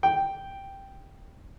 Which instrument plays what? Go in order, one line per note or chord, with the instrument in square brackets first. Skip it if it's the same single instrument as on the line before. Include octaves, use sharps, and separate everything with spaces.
[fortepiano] G5